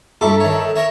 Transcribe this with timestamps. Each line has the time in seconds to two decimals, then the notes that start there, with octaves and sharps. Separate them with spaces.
0.21 G2 A4 E5 A#5 C#6 D6
0.40 D#3 C#5
0.76 A#4 C#5 E5